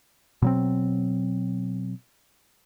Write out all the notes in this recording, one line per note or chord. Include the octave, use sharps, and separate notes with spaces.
B2 F#3 C4